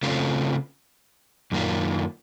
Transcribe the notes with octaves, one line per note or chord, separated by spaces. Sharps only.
C#3 A3 C4 F4
F#2 D#3 A#3 F4